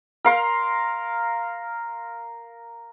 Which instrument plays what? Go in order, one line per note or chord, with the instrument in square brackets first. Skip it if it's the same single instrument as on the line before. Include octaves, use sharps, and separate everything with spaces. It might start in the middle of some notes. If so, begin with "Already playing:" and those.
[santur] A#4 F5 C6